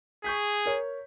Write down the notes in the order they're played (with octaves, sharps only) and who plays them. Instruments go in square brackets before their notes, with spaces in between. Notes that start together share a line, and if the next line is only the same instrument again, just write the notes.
[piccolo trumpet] G#4 [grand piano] C#6 G6 B6
[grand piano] A#4 C#5